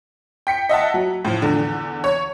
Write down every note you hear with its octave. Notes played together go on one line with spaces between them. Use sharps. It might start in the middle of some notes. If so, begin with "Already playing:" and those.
G5 B6 C#7
D#5 E5 F#5 A5
F#3
A2 F3
E2 D3
C#5